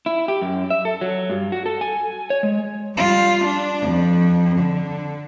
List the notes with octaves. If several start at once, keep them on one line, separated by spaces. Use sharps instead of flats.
E4
G4
F#2
E5
A4
F#3
G2
F#4
A4
G#5
C#5
G#3
G3 F4
D4
F2
D3